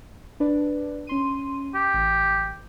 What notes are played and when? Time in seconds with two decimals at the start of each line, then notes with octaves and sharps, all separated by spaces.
0.40 D4 B4 D5
1.07 C#4 C6 D#7
1.75 G4
1.94 A1